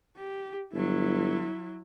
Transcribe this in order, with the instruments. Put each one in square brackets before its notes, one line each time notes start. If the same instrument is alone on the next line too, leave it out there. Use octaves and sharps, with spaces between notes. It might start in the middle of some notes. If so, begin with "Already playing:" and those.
[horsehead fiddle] G4
[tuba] G1 [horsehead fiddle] F#3 E4